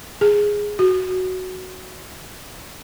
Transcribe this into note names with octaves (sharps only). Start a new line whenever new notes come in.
G#4
F#4